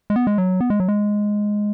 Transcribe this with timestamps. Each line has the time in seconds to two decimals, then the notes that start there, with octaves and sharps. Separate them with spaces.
0.10 G#3
0.16 B3
0.27 G#3
0.38 F#3
0.60 B3
0.70 G#3
0.80 F#3
0.88 G#3